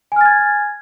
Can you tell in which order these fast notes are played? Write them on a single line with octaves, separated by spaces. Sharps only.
G#5 F6 A6 G#6